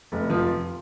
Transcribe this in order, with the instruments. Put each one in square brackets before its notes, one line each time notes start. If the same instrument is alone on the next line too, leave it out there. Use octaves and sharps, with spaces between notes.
[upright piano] F1
F3